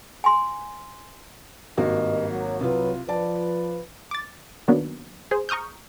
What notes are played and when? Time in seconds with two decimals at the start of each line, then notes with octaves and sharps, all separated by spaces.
0.24 G#5 C6
1.77 G#1 G2 A#3 F#4 D#5
2.29 F#3
2.61 C2 F#3 F4 B4
3.09 F3 B4 D5 A5
4.11 D6 A6
4.68 D#3 F#3 A#3 B3 D4
5.31 G#4 C5
5.49 A#5 C#6 D#6 F6 G6